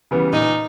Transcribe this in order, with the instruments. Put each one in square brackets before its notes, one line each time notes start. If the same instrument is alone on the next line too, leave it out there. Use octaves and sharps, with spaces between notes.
[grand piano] C#3 E3 G3 B3
[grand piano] A#2 [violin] D#4